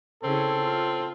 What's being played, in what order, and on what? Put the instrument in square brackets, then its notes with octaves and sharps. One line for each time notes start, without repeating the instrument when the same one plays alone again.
[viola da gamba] C#3 E4 G#4 [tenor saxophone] C4 [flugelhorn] A4
[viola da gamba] F4